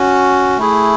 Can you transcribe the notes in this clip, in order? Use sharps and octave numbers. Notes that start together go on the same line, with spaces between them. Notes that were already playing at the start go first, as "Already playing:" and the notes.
Already playing: C#4 F#4
A3 E4 G#4